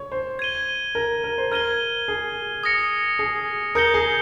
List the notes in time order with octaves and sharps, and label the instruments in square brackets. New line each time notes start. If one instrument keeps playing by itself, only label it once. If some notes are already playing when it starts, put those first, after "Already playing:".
Already playing: [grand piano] C#5
C5
[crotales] G#6 D#7 G7
[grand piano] A#4
A#4
C5
[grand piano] A#4 [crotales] F6 G#6 D#7 G7
[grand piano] G#4
[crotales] D#6 A#6 C#7
[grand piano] G#4
[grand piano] A#4 [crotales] D#6 G6 C#7 G7
[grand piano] G#4